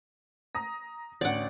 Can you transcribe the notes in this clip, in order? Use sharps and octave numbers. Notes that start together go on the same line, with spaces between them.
A#5 D#6 A#6
A1 D2 D5 F#5